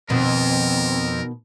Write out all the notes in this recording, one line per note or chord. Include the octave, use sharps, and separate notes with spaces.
F2 B2 D#3 C4 A#4